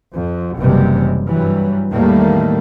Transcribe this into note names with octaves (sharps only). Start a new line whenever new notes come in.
F2
F#1 F#2 C3 E3 G3 G#3
G2 E3 F#3 G3
E2 A2 D#3 G3 A3 A#3